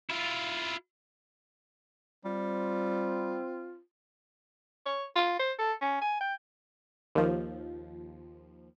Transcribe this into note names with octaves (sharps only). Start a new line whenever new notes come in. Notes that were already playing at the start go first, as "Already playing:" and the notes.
E4 F4
G3 C4 F4
C#5
F4
C5
A4
C#4
G#5
G5
D#2 F3